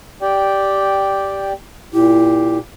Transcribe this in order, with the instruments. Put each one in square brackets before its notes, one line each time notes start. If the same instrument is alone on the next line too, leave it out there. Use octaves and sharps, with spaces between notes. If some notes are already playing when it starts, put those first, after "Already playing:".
[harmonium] G4 D5 G5
[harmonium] A#2 G4 [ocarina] E4